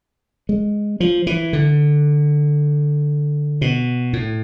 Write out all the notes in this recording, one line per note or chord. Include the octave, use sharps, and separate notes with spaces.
G#3
F3
E3
D3
B2
A2